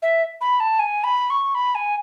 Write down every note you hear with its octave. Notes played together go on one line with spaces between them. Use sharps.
E5
B5
A5
G#5
B5
C#6
B5
G#5